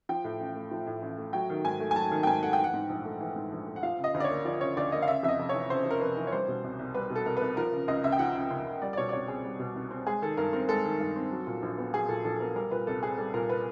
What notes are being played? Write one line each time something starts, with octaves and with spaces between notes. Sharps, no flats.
F3 G5
A2
A1
A3
F3
A2
A1
A3
F#3 G5
D#3
G#2 G#5
A3
G#5
F#3 A5
D#3
G5
G#2 G#5
A3 F#5
G5
E3
F#5
G#2
A#1
A3
E3
G#2
A#1
A3
F#5
F3 F5
C#3
D#5
D2
D5
C#5
A#3
F3 D5
C#3 C#5
D2 D5
A#3 D#5
F5
C#3 E5
F2 E5
D#5
F1
C#5
E3
C#3 C5
F2
A#4
F1 B4
E3
C#5
G3 C5
B2
C2
C2
G3 B4
B2
A4
C2 A#4
C2 B4
F3 A#4
C#3
C#2 D#5
C#2 E5
G5
F3 F#5
C#3
C#2
C#2
G3 D5
D5
B2 C#5
D5
C2 C#5
C4 G#4
G3
B2
C2
C4
G#3 G#4
D#3 A4
G2 A#4
C4 A#4
G#3 A4
D#3
G2
C4
F#3
A#2
A#1
B3
F#3 G#4
A#2 A4
A#1 A4
A4
B3 A#4
G3 A#4
A#2 B4
C2 A4
C4 G#4
G3 A4
A#2 A#4
B4